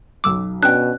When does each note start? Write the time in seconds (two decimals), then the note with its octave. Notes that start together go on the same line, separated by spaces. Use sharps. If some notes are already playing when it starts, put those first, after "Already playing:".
0.24 B1 F#2 D6 E6
0.63 B2 C#4 D4 D5 G5 F#6